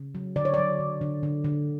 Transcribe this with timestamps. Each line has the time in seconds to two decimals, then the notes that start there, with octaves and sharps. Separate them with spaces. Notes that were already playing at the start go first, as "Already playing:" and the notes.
Already playing: C#3
0.15 F#3
0.36 D3 D5
0.45 C#5
0.54 F#3 D5
0.80 D3
1.01 D3
1.23 D3
1.44 D3